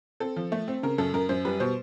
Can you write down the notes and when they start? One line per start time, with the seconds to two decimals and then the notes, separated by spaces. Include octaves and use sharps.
0.20 C4 A4
0.36 F3
0.52 A3
0.68 C4
0.83 C#3 A#4
0.98 F#2 A4
1.14 F#2 A#4
1.29 F#2 C5
1.45 G3 B4
1.60 B2 C5